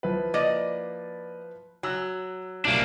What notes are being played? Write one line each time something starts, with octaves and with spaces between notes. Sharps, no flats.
F3 E4 B4
A#3 D5 D#5
F#3 G#5 E6 F#6
C2 A#3 D4